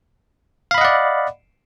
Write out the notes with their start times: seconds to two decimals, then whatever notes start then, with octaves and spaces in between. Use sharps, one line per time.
0.71 F5
0.74 B5
0.78 D#5
0.81 F#5
0.85 D5